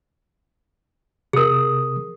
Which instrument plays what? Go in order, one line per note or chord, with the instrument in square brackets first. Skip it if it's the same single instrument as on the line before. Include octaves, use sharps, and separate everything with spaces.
[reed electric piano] C3 D#6 [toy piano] G#4 A#4